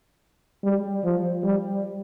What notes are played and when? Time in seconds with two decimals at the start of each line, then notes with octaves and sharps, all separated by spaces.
0.64 G3
1.04 F3
1.43 G3